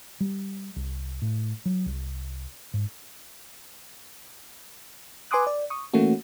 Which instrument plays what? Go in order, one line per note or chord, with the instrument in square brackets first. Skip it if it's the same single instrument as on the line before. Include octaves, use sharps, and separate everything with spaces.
[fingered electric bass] G3
C2
A2
F#3
C2
G#2
[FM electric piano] B4 G#5 C6 D6 D#6 F#6
D5
C#6 D#6
E3 A3 A#3 C#4 F#4